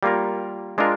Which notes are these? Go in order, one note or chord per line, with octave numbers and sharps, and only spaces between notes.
G3 A#3 F4 A#4
G#3 D4 F4 A#4